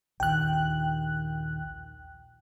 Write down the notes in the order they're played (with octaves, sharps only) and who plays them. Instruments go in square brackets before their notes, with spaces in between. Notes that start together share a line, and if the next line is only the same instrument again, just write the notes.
[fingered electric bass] A#1 D#2 D#3 [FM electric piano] G5 F#6